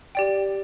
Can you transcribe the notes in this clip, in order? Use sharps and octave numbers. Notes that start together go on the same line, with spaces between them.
G4 D5 G5